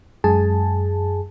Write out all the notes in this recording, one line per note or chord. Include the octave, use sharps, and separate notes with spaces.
F#2 G#3 G#4 G#5 A5